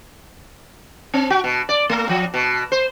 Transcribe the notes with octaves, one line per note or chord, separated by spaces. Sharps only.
C4
F#4
B2
D5
A3
F3
B2
C5